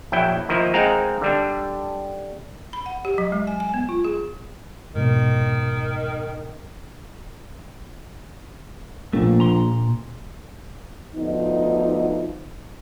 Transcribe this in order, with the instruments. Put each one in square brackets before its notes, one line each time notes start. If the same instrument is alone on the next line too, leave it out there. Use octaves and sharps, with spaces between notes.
[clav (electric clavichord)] A#1 F#3 E4 G5
D#3 F3 A#3 E4
G#3 C4 D#4 A#4 F5 F#5
D3 G3 D4
[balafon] B5
F#5
G4
F#3
G#3
G#5
G#5
B3
F4
G#4
[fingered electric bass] F1 G#2 B2 [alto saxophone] D#3
[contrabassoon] A#1 [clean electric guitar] A#2 A3
[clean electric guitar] A#2 A#5 C6
[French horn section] D2 F3 B3 D#4